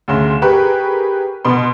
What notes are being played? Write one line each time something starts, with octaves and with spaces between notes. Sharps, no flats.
D2 C#3 C6
G4 G#4 A#4 B4 C#6 F#6
B2 B3 B5 C6